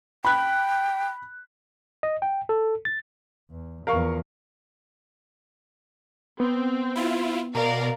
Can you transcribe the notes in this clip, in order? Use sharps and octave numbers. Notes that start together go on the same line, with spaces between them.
G5 B5 F#6
D#5
G5
A4
A6
E2
E2 F3 A#4 F5 C#6
B3 C4
E4 F4
B2 A#4 D5 F5